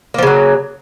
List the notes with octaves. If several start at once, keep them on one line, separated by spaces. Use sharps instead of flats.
C#3 F3 F#3 A#3